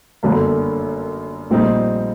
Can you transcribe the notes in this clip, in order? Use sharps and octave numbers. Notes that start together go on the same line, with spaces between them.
G1 F#2 D3 F#3 A#3
A#1 A#2 G3 C4 D#4